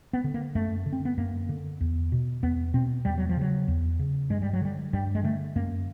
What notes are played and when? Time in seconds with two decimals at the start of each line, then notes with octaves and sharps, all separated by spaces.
0.13 B3
0.24 D3
0.34 A#3
0.55 F#2 A3
0.86 D3
0.93 C4
1.05 B3
1.17 F#2 A#3
1.49 D3
1.81 E2
2.12 B2
2.43 E2 B3
2.74 B2 C4
3.05 E2 G3
3.18 F#3
3.29 F3
3.37 C#3 F#3
3.68 E2
3.99 C#3
4.30 G2 G#3
4.42 G3
4.53 F#3
4.62 D3 G3
4.93 G2 G3
5.15 G#3
5.24 D3 A3
5.55 F#2 A#3